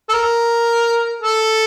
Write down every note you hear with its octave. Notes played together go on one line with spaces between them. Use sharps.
A4
A#4
A4